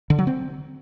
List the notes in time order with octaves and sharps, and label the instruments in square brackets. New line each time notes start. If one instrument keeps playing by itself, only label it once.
[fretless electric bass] D3
F#3
C4